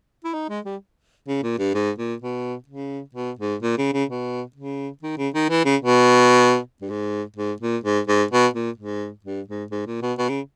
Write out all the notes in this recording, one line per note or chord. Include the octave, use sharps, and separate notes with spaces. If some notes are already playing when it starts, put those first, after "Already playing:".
E4
D#4
G#3
G3
C#3
A#2
G2
G#2
A#2
B2
C#3
B2
G#2
A#2
C#3
C#3
B2
C#3
D#3
C#3
D#3
E3
C#3
B2
G2
G#2
G#2
A#2
G#2
G#2
B2
A#2
G#2
G2
G#2
G#2
A#2
B2
B2
C#3